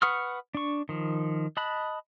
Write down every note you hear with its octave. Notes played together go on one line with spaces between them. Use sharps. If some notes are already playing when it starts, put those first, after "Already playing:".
B4 F#5 C#6 D#6 F6
D4 C#6
D#3 F3
D#5 A5 B5 F#6